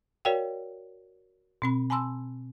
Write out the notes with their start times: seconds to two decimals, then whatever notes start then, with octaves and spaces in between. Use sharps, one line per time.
0.25 F#4 A#4 C#5 D5 F5 G5
1.62 B2 C4 B5
1.90 G#5 A5 B5 C6 E6